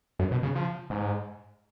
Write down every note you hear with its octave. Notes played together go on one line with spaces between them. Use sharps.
F#2
B2
C#3
F3
G#2